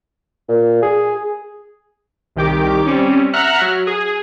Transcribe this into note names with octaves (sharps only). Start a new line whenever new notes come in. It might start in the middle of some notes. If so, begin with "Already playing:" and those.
A#2
G#4
C2 D#3 G4 D6
G3 C4 C#4
E5 F#5 A#5 F6 F#6
F#3
G#4